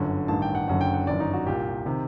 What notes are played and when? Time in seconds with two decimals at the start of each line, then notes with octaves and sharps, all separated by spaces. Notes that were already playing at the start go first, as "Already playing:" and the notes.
Already playing: G1 F#2 D3
0.28 A1 G2 D#3 A5
0.42 G5
0.55 F#5
0.68 F#1 F#2 D3 F#5
0.81 G5
0.94 F#5
1.07 G1 F#2 D#3 D5
1.20 D#4
1.33 F#4
1.46 C2 A#2 G4
1.86 C3 D#3